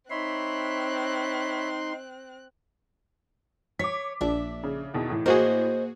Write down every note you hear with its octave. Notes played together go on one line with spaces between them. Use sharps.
C4 D#4 C#5 E5 B5 C6 F#6
C#5 D6 B6
A#1 D4 E5
C#3
E2 B2 D#3
A2 E3
A#3 F#4 G#4 C5 D#5